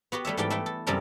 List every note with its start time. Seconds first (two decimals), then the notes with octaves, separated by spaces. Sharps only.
0.12 B3 F#4 G4 B4
0.25 G3 A3 C#5 E5
0.37 G#2 E3 G3 G4 A4 G5
0.50 A3 E4 B4 G5
0.66 A4
0.87 F#2 C3 G3 A4 A#4 G5